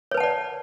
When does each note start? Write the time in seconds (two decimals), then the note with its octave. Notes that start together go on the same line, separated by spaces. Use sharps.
0.11 C#5
0.14 B4
0.17 A5
0.20 F#5
0.23 D5